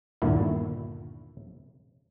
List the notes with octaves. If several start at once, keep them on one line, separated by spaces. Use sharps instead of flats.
G1 D#2 A#2 D3 E4